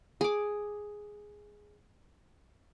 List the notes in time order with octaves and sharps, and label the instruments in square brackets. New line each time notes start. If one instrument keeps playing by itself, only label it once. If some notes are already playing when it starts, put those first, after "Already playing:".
[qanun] G#4 D6